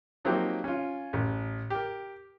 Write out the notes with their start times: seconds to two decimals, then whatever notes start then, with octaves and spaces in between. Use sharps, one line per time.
0.25 F3 F#3 A#3 C4 D#4 G4
0.64 C#4 F4
1.13 A1
1.70 G4 A#4